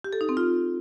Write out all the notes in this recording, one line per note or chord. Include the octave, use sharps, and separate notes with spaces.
G4
A4
D#4
C4
F4